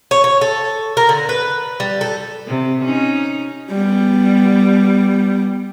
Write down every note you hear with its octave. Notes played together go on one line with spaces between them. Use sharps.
C#5
C#5
A4
A#4
D3
B4
G3
A4
C3
C#4 D#4
G3 B3